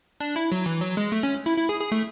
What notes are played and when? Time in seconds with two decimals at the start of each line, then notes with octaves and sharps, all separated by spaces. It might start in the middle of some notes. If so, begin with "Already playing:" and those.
0.20 D4
0.36 E4
0.52 F#3
0.66 E3
0.81 F#3
0.97 G#3
1.12 A3
1.23 C#4
1.46 E4
1.57 E4
1.69 G#4
1.80 G#4
1.92 A3